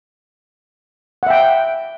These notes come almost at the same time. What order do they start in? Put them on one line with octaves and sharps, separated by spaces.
F#5 E5 G5